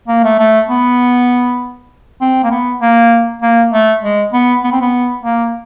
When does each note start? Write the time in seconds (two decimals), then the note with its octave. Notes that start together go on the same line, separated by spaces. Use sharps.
0.08 A#3
0.24 A3
0.39 A3
0.69 B3
2.21 C4
2.44 A#3
2.51 B3
2.82 A#3
3.42 A#3
3.72 A3
4.03 G#3
4.33 B3
4.64 B3
4.72 C4
4.81 B3
5.24 A#3